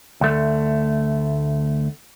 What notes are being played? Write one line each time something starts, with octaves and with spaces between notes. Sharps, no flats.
D2 A3